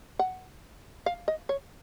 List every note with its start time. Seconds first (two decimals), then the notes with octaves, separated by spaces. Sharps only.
0.19 F#5
1.06 F5
1.28 D#5
1.49 C#5